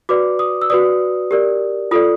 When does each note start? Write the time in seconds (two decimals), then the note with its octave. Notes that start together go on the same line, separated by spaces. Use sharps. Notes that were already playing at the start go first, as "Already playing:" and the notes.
0.09 F#4 B4 D5 D6
0.39 D#6
0.62 E6
0.70 F#4 B4 D5 D#6
1.31 G4 A#4 D5
1.91 F4 A4 D5 D#6